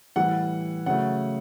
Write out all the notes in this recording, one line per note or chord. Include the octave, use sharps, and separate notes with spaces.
A2 E3 G3 F#5
C#3 F#3 A3 F#5